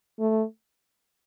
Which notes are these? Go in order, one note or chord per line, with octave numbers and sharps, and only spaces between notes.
A3